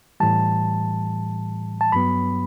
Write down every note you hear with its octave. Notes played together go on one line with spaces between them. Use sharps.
A2 E3 G3 A5
A5
G2 F#3 B3 B5